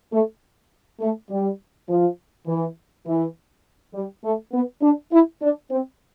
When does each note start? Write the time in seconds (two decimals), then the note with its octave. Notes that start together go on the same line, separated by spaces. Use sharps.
0.12 A3
1.00 A3
1.30 G3
1.88 F3
2.47 E3
3.06 E3
3.94 G3
4.24 A3
4.53 B3
4.82 D4
5.12 E4
5.41 D4
5.70 C4